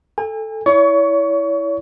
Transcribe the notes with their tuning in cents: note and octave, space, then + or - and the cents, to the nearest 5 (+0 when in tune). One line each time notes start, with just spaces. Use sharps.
A4 +0 G#5 -40
E4 +0 C#5 +35 C#6 +20